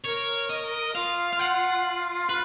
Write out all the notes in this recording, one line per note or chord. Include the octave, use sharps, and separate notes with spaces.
A#4 C#5
D#5
F4 F5
F5
F#5
B4